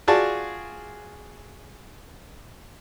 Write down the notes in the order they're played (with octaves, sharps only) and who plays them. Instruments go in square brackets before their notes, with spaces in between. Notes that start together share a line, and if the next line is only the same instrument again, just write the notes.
[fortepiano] F4 F#4 G#4 D5 A5